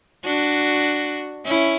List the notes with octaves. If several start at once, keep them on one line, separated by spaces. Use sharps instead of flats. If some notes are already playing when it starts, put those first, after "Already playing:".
D4 F#4
C#4 E4